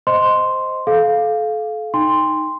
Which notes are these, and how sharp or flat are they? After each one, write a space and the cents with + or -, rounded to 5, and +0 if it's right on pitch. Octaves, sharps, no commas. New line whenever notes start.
C5 -5 D#5 +0 C6 -5
A4 -35 F5 +0
D#4 +0 G5 +35 C6 -5